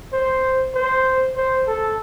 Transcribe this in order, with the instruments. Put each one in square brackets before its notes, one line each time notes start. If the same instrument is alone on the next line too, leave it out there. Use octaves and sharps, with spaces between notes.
[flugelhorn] C5
C5
C5
A4